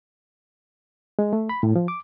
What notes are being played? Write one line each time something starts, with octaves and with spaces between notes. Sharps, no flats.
G#3
A3
B5
A2
F3
D6